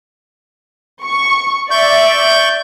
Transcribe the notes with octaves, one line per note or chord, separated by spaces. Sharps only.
C#6
D5 E5 C#6 G6